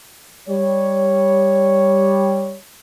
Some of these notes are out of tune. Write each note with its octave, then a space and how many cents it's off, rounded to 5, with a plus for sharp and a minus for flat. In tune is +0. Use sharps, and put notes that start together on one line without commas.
G3 +5 C#5 +0